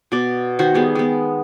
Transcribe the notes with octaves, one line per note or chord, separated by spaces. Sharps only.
B2 D5
D#3 F#4 C5
G3 B3 G#4
G#3 B3